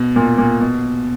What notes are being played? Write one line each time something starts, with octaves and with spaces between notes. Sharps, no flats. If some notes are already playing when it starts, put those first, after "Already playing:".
Already playing: B2
A#2
A#2
B2